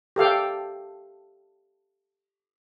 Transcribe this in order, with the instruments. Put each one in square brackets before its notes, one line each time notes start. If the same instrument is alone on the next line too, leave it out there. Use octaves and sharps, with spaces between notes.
[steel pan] G4 A4 F5 G5